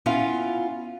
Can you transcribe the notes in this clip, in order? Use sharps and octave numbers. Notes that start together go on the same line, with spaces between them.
B3 C#4 E4 F4 F5